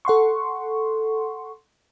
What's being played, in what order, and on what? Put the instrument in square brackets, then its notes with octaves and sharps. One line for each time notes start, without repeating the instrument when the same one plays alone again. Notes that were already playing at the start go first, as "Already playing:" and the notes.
[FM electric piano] A4 F#5 C6 C#6